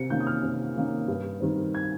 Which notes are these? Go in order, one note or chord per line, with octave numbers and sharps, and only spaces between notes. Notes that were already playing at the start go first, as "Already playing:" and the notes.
Already playing: C3 C#7
D#3 A#3 C#4 G6
D#6
F6
C3
D#3 A#3 C#4
G2
D#3 G3 C4
G#6